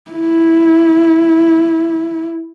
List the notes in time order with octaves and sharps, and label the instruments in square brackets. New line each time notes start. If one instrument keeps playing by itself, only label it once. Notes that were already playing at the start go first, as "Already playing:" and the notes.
[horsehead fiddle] E4